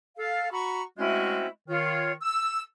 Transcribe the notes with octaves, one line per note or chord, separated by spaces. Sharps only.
A4 F5
F#4 F#5 A#5 B5 C#6
G#3 A3 C4 C#4 E4 F#4
D#3 F4 C#5
E6